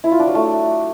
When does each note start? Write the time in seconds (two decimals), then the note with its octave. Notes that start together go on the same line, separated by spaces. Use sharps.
0.04 E4
0.12 F4
0.19 D4
0.27 F#3
0.35 A3